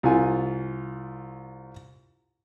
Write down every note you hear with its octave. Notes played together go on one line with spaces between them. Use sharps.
C2 F4 G#5